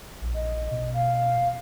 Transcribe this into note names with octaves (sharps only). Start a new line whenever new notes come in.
A#1
D#5
B2
F5